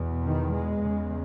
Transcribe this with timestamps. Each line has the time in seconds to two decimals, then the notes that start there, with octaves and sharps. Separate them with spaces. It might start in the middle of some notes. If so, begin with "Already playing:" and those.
Already playing: E2 B2
0.24 D#3
0.53 G#3
0.83 E2 C#3